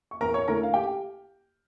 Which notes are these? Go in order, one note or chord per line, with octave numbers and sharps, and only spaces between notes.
C#6
E2 A#4 A#5
C#5 C#6
D3 A3 E4 A#4 A#5
F5
G4 G5